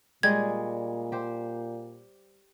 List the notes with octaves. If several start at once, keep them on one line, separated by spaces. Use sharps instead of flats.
A#2 G3 G#3 G#4 G#6
G4 C5